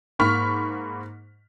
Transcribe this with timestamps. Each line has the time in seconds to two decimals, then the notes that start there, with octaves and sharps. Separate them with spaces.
0.19 G#2 A#3 B5 C#6 F6 B6